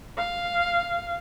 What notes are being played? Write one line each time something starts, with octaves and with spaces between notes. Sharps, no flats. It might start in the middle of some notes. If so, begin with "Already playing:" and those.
F5